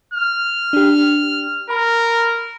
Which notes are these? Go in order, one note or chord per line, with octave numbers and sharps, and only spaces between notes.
F6
D4 G4
A#4 B5